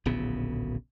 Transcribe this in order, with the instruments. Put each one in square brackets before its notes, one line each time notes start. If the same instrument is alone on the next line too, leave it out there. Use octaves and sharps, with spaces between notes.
[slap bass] D1 A#1 C#3 B3